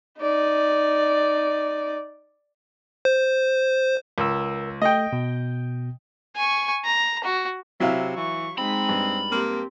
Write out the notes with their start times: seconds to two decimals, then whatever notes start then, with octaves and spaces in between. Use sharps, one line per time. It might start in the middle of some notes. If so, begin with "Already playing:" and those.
0.20 D#4 D5
3.05 C5
4.18 C#2 A#4 E6
4.82 A3 A4 D#5 G5
5.13 B2
6.36 G#5 C#6
6.84 A#5
7.24 F#4
7.80 C3 F#3 E4 F5
8.17 E3 C#6
8.58 G#3 C4 D#4 B5
8.89 G2
9.31 A#3 C4 G4